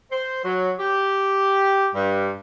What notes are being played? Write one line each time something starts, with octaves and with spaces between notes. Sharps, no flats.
C5
F#3
G4
G2